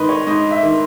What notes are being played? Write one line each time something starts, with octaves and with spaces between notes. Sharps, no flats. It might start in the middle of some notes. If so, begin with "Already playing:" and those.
Already playing: G#2 D#3 B4 D#5
C#5
G#2 D#5
E5
D#3